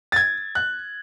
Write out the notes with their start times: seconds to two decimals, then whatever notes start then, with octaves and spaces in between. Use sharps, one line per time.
0.12 A6
0.16 G#6
0.55 F#6